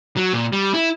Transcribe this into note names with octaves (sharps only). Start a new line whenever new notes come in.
F#3
A#2
G3
E4